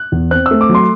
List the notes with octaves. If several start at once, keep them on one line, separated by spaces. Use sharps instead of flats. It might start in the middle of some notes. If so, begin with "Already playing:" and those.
Already playing: F#6
E2
C4 F#6
E6
A3
D6
F#3
C6